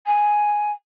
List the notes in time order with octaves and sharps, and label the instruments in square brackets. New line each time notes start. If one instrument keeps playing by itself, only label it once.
[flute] G#5